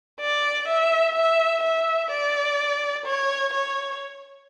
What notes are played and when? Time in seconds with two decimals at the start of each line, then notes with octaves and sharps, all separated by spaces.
0.21 D5
0.68 E5
1.16 E5
1.63 E5
2.11 D5
3.06 C#5
3.53 C#5